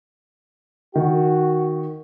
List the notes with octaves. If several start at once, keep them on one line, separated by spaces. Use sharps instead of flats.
D#3 F#4